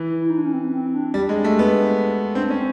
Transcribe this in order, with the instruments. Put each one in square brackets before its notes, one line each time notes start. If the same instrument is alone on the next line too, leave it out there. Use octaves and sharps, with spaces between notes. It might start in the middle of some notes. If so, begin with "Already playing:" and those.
Already playing: [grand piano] E3
[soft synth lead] E4
D#4
D4
C#4
C4
C4
D4
[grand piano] G3
G#3
A3
B3
[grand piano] C4 [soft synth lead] D4
[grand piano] C#4